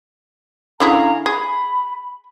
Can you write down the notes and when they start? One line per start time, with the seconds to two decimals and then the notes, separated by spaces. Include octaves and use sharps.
0.80 D3 C#4 E4 G#4 F5 A#5
1.26 G#4 B5